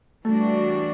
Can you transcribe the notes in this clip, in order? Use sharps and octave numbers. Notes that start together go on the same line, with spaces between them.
E3 G3 A3 D4 F#4